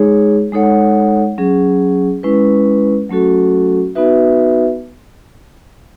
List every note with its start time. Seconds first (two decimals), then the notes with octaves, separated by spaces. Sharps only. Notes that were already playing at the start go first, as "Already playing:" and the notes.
Already playing: G#3 D#4 G#4 C#5
0.52 G#3 D#4 A4 C#5 F#5
1.38 F#3 C#4 G#4
2.23 G#3 C#4 E4 B4
3.09 F#3 A3 C#4 F#4 A4
3.95 B3 D#4 F#4 B4 E5